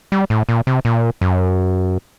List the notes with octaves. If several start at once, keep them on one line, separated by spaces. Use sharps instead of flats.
G3
A2
A#2
C3
A#2
F#2